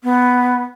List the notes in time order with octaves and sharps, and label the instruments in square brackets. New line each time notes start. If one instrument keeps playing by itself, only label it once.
[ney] B3